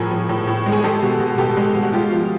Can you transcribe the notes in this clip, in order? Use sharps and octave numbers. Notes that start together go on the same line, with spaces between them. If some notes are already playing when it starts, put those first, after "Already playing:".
Already playing: A2 F3 G#4 A#4
F3
A2
A2
G#3
G#4
G#3 G4 A4
B2
B2
B2 G4 A4
G#3
B2
F#4
G#3 F4 G4
F3